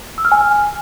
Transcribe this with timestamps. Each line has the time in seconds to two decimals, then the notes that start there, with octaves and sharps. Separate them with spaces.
0.18 E6
0.25 F6
0.32 G#5